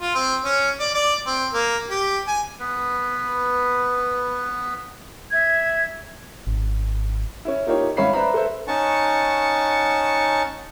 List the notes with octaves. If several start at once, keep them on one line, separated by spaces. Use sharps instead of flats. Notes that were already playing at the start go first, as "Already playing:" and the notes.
F4
C4
C#4
D5
D5
C4
A#3
G4
G#5
B3 B4
E5 G#6
G#1
C#4 E4
A#3 D#4 F4 G4 A#4 C#5
G#1 C#4 E5 F5 B5 C7
B4 C5 D5 E5 A#5 B5
A4 B4 C5 E5
C#4 D#4 F#5 A5 C#6